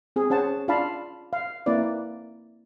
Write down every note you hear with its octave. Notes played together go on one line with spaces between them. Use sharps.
C4 G#4
C#4 G#4 C5 F#5 A5
D4 F4 D5 F5 A5 B5
F5
A#3 C4 E4 B4 D5